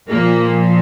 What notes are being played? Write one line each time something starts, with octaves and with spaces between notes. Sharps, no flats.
A#2 F3 A#3